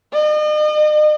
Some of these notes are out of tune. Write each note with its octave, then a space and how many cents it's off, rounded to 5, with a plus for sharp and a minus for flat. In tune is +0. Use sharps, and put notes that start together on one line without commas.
D#5 -40